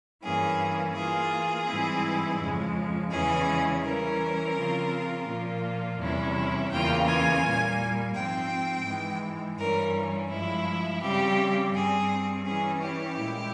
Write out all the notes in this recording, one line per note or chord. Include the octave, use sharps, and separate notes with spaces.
G2 E3 A#3 C#4 G#4
E3 A#3 F4 G#4
G#2 E3 G3 C4 E4
F2 C#3 F3 G#3
E2 C#3 E3 G#3 C#4 G#4
E3 G3 C#4 A#4
C#3 F3 C4 F4
A#2 F3 A#3 F4
E2 C3 G3 C#4 E4
E2 C#3 E3 A#3 F4 G5
G#5
A#2 G3 A#3
G#2 F3 C4 G5
G#2 E3 G#3
G2 E3 G3 C#4 A#4
G2 F3 G#3 E4
C#3 G3 C4 G4
G2 G3 C4 G#4
E3 G3 C#4 G#4
G4
A#2 G#3 E4